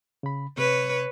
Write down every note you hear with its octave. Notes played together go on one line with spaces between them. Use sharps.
C#3 B5
C3 B4 C#5